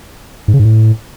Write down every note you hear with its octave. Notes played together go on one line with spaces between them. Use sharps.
G#2
C#3
G#2
A2